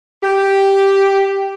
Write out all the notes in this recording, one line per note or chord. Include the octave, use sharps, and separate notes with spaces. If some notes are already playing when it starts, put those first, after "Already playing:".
G4